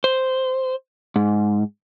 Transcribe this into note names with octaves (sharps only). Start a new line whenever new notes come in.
C5
G#2